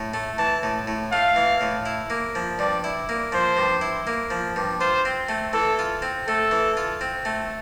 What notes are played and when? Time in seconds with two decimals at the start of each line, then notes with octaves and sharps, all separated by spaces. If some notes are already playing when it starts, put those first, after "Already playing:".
Already playing: A2
0.14 A3
0.38 E3 A5
0.63 A2
0.87 A2
1.12 A3 F5
1.36 E3
1.61 A2
1.86 E4
2.10 A#3
2.35 F3
2.59 G2 D5
2.84 E4
3.09 A#3
3.32 F3 C5
3.57 G2
3.81 E4
4.07 A#3
4.30 F3
4.56 G2
4.80 F4 C5
5.05 C4
5.29 A3
5.53 E3 A4
5.79 F4
6.02 C4
6.27 A3 A4
6.51 E3
6.77 F4
7.01 C4
7.25 A3